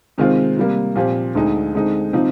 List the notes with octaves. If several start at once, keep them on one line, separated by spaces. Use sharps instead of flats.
C3 D#3 G#3 C4 F4
C3 G3 A#3
A#2 F3 C4 G4
D2 D3 G#3 D#4
D3 G#3 C4 D#4
C3 F3 C4 D#4